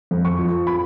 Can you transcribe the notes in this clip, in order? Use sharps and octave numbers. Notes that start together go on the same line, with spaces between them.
F2
C#6
F3
B5